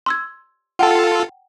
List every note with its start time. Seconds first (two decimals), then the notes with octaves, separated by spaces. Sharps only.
0.06 C6 E6 G#6
0.79 F4 A4 F#5 G5 A5